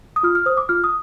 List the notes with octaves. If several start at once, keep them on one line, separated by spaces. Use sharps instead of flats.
D#6
F4 F6
F6
C5 D#6
D6
F4 F6
D#6